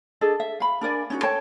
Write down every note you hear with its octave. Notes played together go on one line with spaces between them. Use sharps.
D4 G#4 A4 D#5
E5
F5 B5
D4 A#4 D5 G#5
C#4 D#4 F#4
A4 C#5 G5 A5